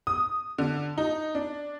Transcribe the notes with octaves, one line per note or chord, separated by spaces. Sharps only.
D#6
D3
D#4
D4